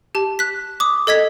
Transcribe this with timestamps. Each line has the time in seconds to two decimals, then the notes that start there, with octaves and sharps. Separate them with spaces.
0.15 G4 A5
0.39 F#6 B6
0.80 D6 D#6
1.07 A4 D#5 G#6 B6